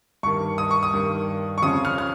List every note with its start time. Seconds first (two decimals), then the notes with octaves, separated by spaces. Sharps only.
0.23 G2 D#3 C#6
0.58 D#6
0.71 C#6
0.83 D#6
0.93 G2 D#3
1.58 C#6
1.62 F2 C#3 D#6
1.85 F6
1.98 F6